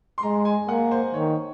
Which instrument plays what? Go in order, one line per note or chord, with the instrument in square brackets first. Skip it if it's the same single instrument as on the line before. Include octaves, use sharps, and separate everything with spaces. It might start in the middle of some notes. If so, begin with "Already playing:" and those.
[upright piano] C6
[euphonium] G#3 [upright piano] A#5
[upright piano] G#5
[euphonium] A#3 [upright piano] F#5
[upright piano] C5
[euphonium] D#3 [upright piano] C#5